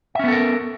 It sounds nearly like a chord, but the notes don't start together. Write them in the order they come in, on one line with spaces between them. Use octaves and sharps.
E5 C#4 B3 A4 A#4